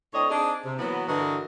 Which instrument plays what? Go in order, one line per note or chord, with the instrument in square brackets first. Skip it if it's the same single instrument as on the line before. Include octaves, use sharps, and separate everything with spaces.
[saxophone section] A2 C4 D4 C#5 D#5
C4 D4 D#4 G#4
C3
E3 F#3 A#3 B3
G2 D3 E3 F#4 A#4 D#5